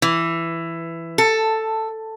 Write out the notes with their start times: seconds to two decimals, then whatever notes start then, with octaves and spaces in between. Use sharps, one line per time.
0.02 E3
1.18 A4